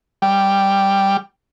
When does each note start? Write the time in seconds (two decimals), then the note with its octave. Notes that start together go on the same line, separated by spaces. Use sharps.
0.22 G3